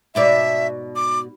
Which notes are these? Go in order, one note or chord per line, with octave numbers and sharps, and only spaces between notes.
G#2 B2 D5 E5
D6